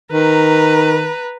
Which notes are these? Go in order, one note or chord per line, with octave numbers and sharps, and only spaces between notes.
D#3 B4 A#5